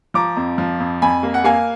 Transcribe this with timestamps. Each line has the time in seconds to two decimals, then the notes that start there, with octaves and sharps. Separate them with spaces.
0.14 F3 A#5 D6
0.37 F2
0.58 F3
0.80 F2
1.02 F2 G#5 B5
1.23 A#3
1.34 F#5
1.44 A#3 F5 G#5